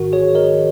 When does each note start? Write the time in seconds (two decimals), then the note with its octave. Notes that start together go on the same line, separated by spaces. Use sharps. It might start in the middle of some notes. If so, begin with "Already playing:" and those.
Already playing: G#1 G#2 D#3 F#4 A#4
0.13 G#4 C#5
0.35 A#4 D#5